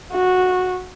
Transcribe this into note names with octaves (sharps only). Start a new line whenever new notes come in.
F#4